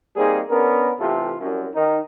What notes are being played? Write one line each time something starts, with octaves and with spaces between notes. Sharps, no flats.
G3 A#3 C4 D#4 G#4
B3 C#4 D4 A#4
C3 E3 A3 F4 G4 A4
C2 F#2
D#3 D#4